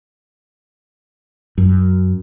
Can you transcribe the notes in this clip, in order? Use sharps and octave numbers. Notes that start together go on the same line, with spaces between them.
F#2